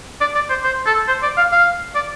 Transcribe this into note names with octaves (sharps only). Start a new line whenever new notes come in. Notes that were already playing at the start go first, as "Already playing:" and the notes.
D5
D5
C5
C5
A4
C5
D5
F5
F5
D5